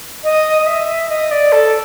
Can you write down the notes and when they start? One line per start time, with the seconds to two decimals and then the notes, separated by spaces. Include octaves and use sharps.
0.24 D#5
0.62 D#5
0.67 E5
1.09 D#5
1.31 D5
1.52 A4